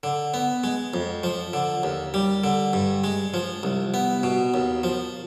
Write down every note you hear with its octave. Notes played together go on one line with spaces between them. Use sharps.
D3
B3
G#3
F2
F3
D3
D#2
G3
D3
G2
G#3
F3
C2
B3
B2
D#2
F3